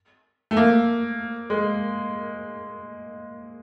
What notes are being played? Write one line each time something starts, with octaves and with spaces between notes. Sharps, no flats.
A3
A#3
G#3